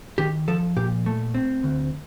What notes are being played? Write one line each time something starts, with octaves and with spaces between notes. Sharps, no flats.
D#3 G4
F3 A4
A#2 G4
A3
C4
D2